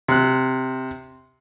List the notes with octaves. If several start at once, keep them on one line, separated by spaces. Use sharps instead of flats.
C3 F#6